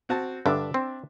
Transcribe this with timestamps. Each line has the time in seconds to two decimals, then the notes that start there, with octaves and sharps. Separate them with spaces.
0.09 C4 F#4 A5
0.46 G2 D3 D4 E5 D6
0.74 C4